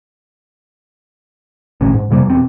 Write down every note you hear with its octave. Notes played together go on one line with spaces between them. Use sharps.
A1 D2 A#2 C#4
G#2
F2 C3 G3 A#3
E1 B2 C4